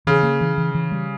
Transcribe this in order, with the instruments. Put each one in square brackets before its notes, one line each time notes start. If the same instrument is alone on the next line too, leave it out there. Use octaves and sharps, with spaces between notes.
[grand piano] C#3 [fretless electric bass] E3
[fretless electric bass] A#3
E3
E3
E3
G3